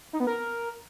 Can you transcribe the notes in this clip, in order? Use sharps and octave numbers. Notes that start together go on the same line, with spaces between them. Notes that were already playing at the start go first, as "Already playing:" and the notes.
D#4
B3
A#4